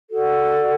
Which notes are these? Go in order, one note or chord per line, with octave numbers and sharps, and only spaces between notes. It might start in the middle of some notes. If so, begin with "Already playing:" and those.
F#4 A4 D5 F#5